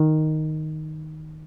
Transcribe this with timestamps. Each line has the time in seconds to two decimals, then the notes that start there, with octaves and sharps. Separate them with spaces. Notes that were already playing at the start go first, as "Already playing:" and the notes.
Already playing: D#3